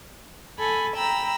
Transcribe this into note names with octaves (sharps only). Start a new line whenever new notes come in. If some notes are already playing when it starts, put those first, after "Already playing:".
A4 G#5 B5
G5 A#5 B5 E6